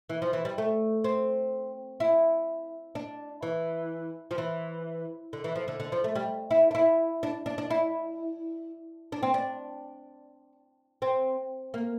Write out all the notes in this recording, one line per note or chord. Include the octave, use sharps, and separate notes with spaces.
E3
F3
E3
G3
A3
C4
E4
D4
E3
F3
E3
D3
E3
F3
D3
D3
F3
A3
G3
E4
D4
E4
D4
D4
D4
E4
D4
C4
D4
C4
A#3